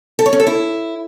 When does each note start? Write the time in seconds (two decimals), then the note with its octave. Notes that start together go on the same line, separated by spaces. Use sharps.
0.19 A4
0.26 C#5
0.33 C#4
0.40 A4
0.47 E4